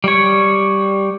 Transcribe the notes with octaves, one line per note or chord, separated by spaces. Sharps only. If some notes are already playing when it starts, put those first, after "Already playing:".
G3 C#5